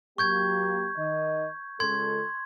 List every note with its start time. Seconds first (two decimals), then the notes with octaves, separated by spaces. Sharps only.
0.18 F#3 A#3 G4 C#6 G6 G#6
0.97 D#3 D#5
1.80 C#2 A4 C6 G#6